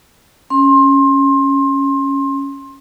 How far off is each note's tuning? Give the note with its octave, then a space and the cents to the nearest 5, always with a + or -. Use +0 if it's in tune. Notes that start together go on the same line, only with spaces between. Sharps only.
C#4 +0 C6 +25